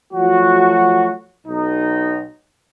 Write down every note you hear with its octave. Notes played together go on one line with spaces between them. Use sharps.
F3 F#3 A3 F#4
B1 D#4